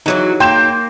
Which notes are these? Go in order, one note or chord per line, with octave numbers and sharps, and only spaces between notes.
E3 F#3 D#4 F#4 G#4 C#5
A#3 G5 C6 G6 E7